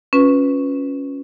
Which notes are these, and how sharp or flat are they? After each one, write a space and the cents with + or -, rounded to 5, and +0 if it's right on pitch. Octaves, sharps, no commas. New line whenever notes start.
C#4 +0 F4 +30 B4 +0